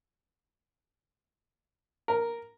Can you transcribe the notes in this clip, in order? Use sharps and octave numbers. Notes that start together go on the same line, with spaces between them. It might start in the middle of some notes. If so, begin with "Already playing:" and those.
A#4